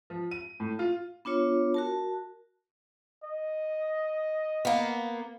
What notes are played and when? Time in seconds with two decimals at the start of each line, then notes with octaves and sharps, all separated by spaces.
0.10 F3
0.31 D#7
0.60 A2
0.79 F4
1.25 B3 D4 F4 C#5
1.74 F#4 A#4 A5
3.23 D#5
4.65 A#3 B3